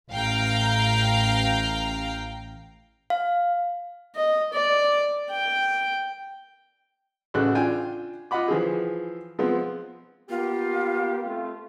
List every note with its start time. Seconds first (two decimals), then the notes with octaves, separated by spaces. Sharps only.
0.12 A1 F5 G5 A#5
3.10 F5
4.16 D#5
4.53 D5
5.31 G5
7.34 A1 C#3 F#4 A4 F#6
7.55 D4 F4 G5 G#5
8.31 F4 D#5 F#5 B5 D6
8.48 E3 F3 G4 G#4
9.39 F3 G#3 B3 C4
10.30 A#3 B3 F4 G4
11.23 A3 C4 F4